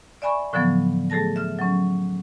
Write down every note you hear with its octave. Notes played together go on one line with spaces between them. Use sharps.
D5 E5 G#5 B5 C#6
A2 D3 F3 F#3 B3
A3 G#4 A4 A5 A#6
E5 F6
F#3 C#4